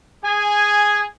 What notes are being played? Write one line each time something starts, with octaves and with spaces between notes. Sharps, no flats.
G#4 G#5